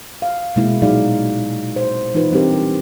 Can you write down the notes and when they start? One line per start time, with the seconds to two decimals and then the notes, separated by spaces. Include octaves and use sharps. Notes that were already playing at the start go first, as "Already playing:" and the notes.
0.22 F5
0.56 B2 G#3 A#3 E4
0.82 A#2 F#3 D#4 G#4 D5 F5
1.76 C5
2.14 E3 D#4 F4 B4
2.32 G3 C4 D4 G4 A#4